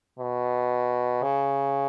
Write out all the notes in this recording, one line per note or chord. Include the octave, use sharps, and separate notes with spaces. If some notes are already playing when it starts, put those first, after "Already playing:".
B2
C#3